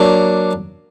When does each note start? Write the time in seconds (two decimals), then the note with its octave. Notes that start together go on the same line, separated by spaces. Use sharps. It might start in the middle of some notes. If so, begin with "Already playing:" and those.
Already playing: F#3 A#3 D4